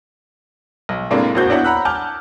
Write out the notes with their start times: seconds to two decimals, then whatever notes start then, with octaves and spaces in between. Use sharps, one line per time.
0.89 B1
1.11 A2 C3 G#3 A#3 D4 F4
1.35 A#1 F2 A#3 F#4 C5 G6
1.49 B3 D4 E4 C#5 F#5
1.64 F#5 A#5 B5 E6 F#6
1.85 F#5 G#5 A5 D6 F6 G6